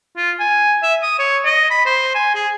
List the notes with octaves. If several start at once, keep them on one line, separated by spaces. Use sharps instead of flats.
F4
G#5
E5
D#6
C#5
D#5
B5
C5
G#5
G#4